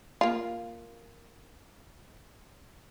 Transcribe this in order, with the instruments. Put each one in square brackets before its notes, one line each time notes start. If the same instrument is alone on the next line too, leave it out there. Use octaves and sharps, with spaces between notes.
[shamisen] A#3 F4